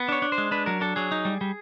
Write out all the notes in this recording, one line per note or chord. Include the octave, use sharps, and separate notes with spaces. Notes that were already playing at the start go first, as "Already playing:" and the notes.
Already playing: B3
D4 C#5
D4
C5
G#3
D4 B4
F#3 A#4
D4 A4
F#3 G#4
D#4
G3
G3